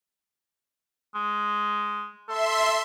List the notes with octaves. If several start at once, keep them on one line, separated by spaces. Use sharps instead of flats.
G#3
A4 E5 C6